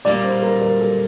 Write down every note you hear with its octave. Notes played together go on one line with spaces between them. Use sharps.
A#2 G3 A#3 D5
C5
A#4
A#4
A4